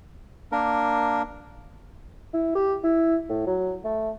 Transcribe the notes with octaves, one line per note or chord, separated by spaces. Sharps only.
A#3 D4 A#4
E4
G4
E4
A2
F#3
A3